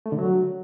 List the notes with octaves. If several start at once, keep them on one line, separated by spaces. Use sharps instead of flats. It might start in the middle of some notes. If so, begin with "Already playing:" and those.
A3
D3
F#3